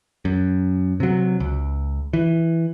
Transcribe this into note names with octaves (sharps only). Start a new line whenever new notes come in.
F#2
C3 F#3
C#2
E3